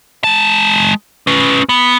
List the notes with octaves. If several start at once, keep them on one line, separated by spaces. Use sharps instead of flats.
G#3 A5
C#4 B4
B3